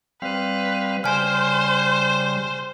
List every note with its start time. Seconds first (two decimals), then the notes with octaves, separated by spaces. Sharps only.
0.22 G3 C4 B4 F5
1.04 C#3 G3 C5 G#5 F6